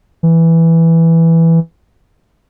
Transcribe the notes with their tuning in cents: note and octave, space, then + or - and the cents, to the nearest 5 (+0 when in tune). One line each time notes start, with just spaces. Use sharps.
E3 +0